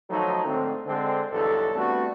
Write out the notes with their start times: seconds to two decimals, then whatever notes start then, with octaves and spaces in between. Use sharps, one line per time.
0.10 D#3 F3 F#3 A3 D#4
0.45 G#2 D3 A3 C4
0.86 D3 G#3 C4
1.32 B1 E2 G2 D3 A4
1.76 G3 A3 B3 C4 D4 F#4